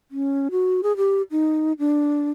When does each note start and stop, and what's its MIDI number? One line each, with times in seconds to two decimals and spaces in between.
0.11 0.48 61
0.51 0.81 66
0.83 0.96 68
0.97 1.22 67
1.31 1.73 63
1.79 2.30 62